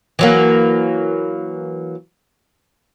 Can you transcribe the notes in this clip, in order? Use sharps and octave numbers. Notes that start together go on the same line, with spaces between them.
E3 F#3 A#3